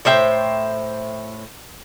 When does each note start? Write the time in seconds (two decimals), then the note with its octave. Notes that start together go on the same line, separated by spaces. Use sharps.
0.05 A2 C5 E5 G5